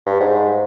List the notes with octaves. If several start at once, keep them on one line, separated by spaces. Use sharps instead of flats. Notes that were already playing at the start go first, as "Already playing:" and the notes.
G2
G#2